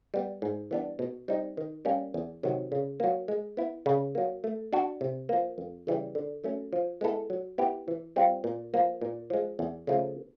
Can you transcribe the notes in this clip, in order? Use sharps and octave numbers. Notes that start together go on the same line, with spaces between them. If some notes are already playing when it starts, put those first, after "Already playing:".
G3 B3
G#2
E3 G3 B3 D4
B2
G3 C4 D#4
D#3
G3 A#3 C#4
E2
C3 D#3 F#3
C#3
F#3 A#3
G#3
B3 E4
C#3
F#3 A#3
A3
D4 F#4
C3
F3 A#3
F2
C#3 E3 G3
D3
F#3 A3 C#4
F3
G#3 B3 E4 A4
F#3
B3 E4 G4
E3
G3 C4 F4
A#2
F3 A#3
A#2
F3 G#3
E2
C#3 F3 A3